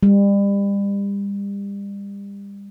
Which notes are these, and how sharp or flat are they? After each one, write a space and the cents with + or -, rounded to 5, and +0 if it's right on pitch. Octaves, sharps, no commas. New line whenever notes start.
G3 +35